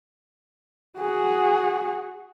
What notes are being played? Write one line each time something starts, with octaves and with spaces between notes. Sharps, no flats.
F#4 G#4